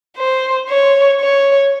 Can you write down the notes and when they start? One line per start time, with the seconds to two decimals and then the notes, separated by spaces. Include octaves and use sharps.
0.17 C5
0.69 C#5
1.21 C#5